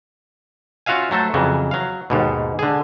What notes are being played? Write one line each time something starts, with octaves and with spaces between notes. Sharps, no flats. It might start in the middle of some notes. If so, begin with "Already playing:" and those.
C#4 F4 F#4 E5 F5 G#5
F#3 A3 A4 C5
F2 C#3 E3 F#3
F#3 F5
D#2 G#2 B2
D3 G#4